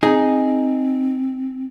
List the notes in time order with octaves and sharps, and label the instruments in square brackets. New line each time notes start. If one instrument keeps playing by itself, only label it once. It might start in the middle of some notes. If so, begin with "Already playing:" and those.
[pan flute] C4 [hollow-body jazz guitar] D#4 G#4